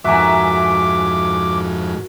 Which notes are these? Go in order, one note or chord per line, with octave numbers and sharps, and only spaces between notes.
F2 G#2 F#4 A#4 E5 G#5 D6